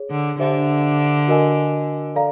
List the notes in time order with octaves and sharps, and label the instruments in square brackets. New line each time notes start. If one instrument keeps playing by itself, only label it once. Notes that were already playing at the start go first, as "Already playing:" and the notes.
Already playing: [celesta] G#4 C#5
[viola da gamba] D3
[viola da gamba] D3 [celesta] D4 G4 C5 E5
[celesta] F#4 A#4 D#5 G#5
A4 D5 F5 A#5